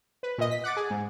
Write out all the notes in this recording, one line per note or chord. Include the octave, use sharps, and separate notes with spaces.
B4
A#2 D#5
B6
F#5 D6 A6
G#4
G#2